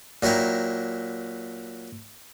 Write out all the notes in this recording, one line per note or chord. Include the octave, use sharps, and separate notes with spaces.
A#2 F#3 E4 G5 A#5